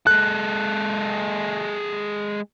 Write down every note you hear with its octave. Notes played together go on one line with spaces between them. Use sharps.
G#3 A4 F#6